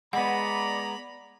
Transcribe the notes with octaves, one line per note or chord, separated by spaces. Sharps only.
G#3 B3 D5 F#5 A#5 B5